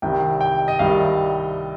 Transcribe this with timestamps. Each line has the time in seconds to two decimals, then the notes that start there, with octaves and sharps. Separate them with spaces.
0.02 C2 C3 D#3 G3 G5
0.41 G5
0.68 D#5
0.79 C2 C3 D#3 G3 F5